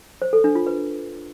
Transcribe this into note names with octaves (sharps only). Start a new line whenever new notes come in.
C5
A4
D4
F4
B4